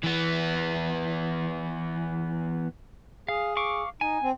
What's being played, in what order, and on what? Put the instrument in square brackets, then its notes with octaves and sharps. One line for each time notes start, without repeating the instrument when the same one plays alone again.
[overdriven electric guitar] E3 B3
[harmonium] G#4 [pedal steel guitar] F5
[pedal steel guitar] F5 C#6 D6
[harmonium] D#4 [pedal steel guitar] G#5
[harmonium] C4